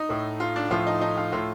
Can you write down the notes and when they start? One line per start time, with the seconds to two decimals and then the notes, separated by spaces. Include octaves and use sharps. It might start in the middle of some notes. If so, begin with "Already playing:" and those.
Already playing: D#4
0.09 A2 A3
0.40 F4
0.56 D4
0.71 A2 F3 A3 F4
0.87 D#4
1.01 D#4
1.17 F4
1.32 A2 A3 F4